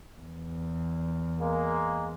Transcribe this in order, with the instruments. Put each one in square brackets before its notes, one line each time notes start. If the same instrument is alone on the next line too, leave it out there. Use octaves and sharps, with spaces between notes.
[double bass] E2
[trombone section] G#3 A#3